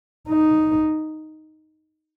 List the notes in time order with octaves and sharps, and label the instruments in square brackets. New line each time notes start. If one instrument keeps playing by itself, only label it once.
[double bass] D#4